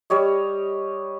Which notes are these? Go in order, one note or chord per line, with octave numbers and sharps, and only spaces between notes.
G3 G4 C#5 D#5